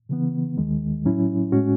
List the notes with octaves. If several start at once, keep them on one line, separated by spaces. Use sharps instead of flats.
C#3 E3 B3
D#2 D#3 G#3
A2 F#3 C#4 E4
A2 G#3 C#4 F#4